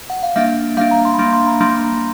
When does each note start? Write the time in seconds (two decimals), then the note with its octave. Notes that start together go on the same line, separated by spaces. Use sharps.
0.10 F#5
0.23 F5
0.36 G3 A#3 D4 E5
0.77 G3 A#3 D4 F5
0.91 A#5
1.05 C6
1.14 B5
1.18 G3 A#3 D4 C6
1.33 C6
1.47 A#5
1.61 G3 A#3 D4 C6